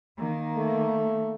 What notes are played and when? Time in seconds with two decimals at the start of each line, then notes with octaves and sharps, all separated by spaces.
0.17 D#3 A#3
0.57 A3